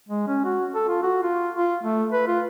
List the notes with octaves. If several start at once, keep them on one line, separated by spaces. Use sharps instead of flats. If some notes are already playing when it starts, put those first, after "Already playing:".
G#3
C#4
F#4
A4
F4
F#4
F4
F4
A3
B4
F4